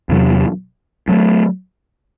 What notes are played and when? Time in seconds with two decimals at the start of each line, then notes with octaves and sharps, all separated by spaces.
0.09 E2 C3 F#3
1.08 G2 F#3 A3